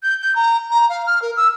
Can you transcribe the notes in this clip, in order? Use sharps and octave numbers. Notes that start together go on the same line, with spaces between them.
G6
G6
A#5
A#5
F5
F6
A#4
E6